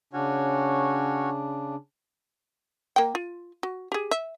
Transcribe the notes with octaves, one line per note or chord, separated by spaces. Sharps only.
C#3 C#4 D4 F#4 C#5
A#3 G5
F4
F#4
G4 G#4
E5